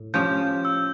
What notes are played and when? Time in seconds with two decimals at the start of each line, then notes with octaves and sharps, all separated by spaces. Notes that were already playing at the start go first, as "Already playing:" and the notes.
Already playing: A2
0.14 F3 C#4 G4 G6
0.65 E6